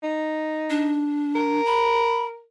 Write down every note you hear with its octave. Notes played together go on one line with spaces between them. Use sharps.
D#4
D4
A#4
B5